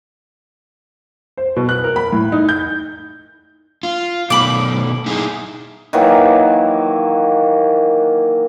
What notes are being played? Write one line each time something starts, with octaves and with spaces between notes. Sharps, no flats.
C5
B2
F#6
A#4
B5
A2
D#4
G6
F4
B2 D#3 A3 B5 D6
D#4 E4 G#4
D#3 E3 F#3 A#3